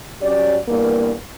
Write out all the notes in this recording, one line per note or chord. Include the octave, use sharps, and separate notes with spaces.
F#3 C#4 G4 D5
E2 G2 A#3